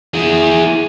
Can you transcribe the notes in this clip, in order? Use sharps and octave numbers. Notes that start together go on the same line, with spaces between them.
E4 G#4